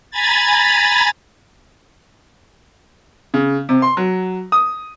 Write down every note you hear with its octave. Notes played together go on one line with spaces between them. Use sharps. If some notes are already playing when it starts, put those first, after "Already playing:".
G#5 A#5 B5 G#6 A6
C#3
C3
C6
F#3
D#6